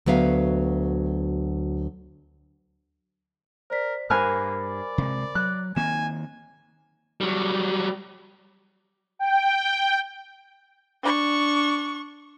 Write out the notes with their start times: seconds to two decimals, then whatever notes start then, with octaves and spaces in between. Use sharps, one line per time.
0.06 D2 F#3 B3 E5 F5
3.70 A#4 C5 D5 B6
4.10 G2 A#3 A#4 C5 G#5 B5 F6 F#6
4.60 D5
4.98 C3 G#3
5.35 F#3 F#6
5.76 D#3 A#3 C4 G#5 E7
7.21 F#3 G3
9.19 G5
11.03 D4 C#6